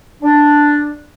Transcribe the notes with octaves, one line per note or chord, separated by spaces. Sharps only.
D4